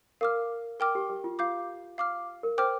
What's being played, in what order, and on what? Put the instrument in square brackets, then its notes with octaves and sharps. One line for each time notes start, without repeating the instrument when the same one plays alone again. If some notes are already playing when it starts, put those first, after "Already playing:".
[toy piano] A#4 [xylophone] F5 D6 F6
[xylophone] A#4 G5 D6 F6
[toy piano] G4
G4
F4
[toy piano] F4 [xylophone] F5 D6 G6
[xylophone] F5 D6 F6
[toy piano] A#4
[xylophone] C5 G5 D6 F6